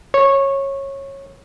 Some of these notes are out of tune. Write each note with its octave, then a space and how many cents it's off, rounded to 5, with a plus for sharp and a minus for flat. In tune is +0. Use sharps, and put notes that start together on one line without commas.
C#5 -15